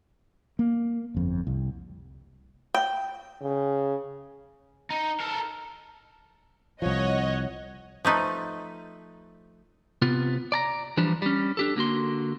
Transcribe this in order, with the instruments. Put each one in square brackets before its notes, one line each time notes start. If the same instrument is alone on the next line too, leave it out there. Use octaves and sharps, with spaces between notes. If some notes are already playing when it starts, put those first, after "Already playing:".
[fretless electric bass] A#3
G1 F2
C2
[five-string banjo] G5
[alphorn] C#3
[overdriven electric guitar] D#4
A4 A#4
[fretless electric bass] C2 F3 [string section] C#5 D#5 F#5
[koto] F3 A3 D#4 B4
[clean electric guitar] C3 B3 F4
D5 A5 A#5
E3 F3 G3 D4
G3 C#4
D4 G4 A4
D3 A#3 F#4 C6